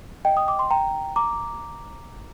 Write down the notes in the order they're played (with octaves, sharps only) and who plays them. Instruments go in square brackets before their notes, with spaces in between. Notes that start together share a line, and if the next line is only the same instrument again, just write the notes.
[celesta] D#5 G5
D#6
D6
C6
G5 A#5
A#5 D6